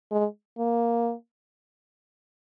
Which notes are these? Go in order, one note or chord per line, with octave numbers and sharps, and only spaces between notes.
G#3
A#3